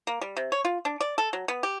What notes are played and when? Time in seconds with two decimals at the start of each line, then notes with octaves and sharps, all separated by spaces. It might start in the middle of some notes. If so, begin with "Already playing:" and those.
0.07 A#3
0.21 G3
0.37 C3
0.52 C#5
0.65 F4
0.85 D4
1.00 D5
1.18 A4
1.33 F#3
1.48 B3
1.63 G4